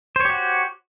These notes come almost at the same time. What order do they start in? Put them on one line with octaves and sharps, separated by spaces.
C5 C#5 G4 F#4